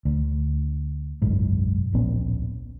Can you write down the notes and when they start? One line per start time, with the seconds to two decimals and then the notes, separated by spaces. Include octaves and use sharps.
0.05 D2
1.22 F#1 B1 G#2
1.92 D1 A#1 B3 C#4